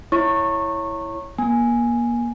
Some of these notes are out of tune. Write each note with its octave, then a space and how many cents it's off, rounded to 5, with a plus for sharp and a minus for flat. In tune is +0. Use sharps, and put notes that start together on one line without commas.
E4 +0 C#5 +0 C#6 -20
A#3 +35 G#5 +0